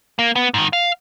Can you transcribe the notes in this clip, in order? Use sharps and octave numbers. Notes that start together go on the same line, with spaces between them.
A#3
B3
G#2 D#3
F5